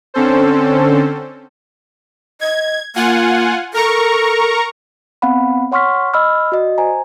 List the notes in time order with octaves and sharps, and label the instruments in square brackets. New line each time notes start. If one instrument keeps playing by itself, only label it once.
[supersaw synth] D3 C4 C#4 A4 C5
[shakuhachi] D#5 [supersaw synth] G#6
[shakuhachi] A#3 [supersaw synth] F4 F#5 G#5
[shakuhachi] A4 [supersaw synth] A#4 A#5 C#6
[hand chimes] B3 C4 F5 F#5 B5
C#5 F#5 C6 C#6 F6 B6
D#5 B5 E6 F6
F#4 D5 D#5
C5 G#5 A#5